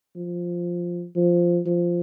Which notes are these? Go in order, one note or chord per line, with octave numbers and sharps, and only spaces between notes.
F3
F3
F3